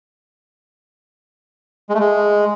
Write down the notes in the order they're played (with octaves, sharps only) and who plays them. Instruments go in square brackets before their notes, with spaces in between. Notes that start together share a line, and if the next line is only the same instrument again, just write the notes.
[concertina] G#3
A3
G#3